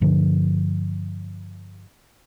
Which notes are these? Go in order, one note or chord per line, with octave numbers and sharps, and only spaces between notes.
G2 D3 F3